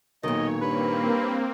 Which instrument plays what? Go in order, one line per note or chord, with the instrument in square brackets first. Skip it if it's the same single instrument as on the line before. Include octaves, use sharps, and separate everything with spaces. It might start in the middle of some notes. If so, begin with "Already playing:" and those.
[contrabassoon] B1 [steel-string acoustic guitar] A#2 D#3 [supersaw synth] C#5 [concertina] D#5
[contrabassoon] G2 [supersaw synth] A#3 C4 [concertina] B4